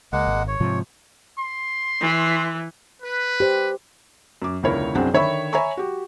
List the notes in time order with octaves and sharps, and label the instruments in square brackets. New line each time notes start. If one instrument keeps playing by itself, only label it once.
[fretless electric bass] C#2 [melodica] G#3 A#3 F#5
[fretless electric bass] G#1
[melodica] C#5
[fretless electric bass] G#2 C3 F3
[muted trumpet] C6
[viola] E3
[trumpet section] B4
[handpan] G4 C5
[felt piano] F#2 D6
E1 C#2 D3 E4 A#4 C#5
C2 F#2 C4 D4 G#4 F#5
D3 D#3 C#5 E5 B5 C#6
C#5 E5 G#5 A#5 B5 C#6
F#4 G4